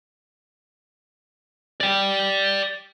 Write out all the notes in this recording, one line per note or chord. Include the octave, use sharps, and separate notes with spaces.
D5 G5